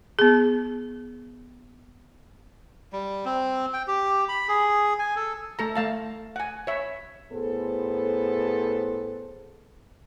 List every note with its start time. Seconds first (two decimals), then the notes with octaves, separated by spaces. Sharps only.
0.19 B3 G#4
2.93 G3
3.25 C4
3.73 G5
3.88 G4
4.29 B5
4.49 G#4
4.99 G#5
5.16 A4
5.59 A3 A4 A#5
5.76 A3 F5 A5
6.36 F#5 G#5
6.67 C#5 E5
7.31 A2 B3 G#4 A4 C5